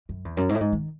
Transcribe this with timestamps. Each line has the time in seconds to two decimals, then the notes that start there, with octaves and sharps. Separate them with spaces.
0.09 F#2
0.25 E2
0.37 F#2
0.49 G#2
0.55 A2
0.60 G#2
0.72 D#3